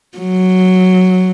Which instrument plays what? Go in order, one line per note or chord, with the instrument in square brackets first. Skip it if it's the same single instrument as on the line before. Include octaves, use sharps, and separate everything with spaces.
[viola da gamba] F#3